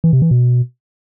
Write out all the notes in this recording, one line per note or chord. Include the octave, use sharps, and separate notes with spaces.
E3
C3
E3
B2